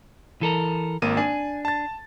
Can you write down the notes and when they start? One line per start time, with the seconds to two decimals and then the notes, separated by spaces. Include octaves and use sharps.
0.41 E3 A4 A#4
1.02 G#1 A#3 D#7
1.17 D4 G#5
1.65 A5 A6